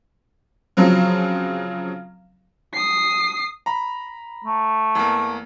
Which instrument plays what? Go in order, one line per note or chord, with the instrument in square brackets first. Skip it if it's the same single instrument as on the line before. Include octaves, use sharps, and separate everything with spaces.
[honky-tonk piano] C#3 F3 F#3 C4
[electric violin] D#6 C7
[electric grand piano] A#5 B5
[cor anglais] A3
[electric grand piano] E2 A#3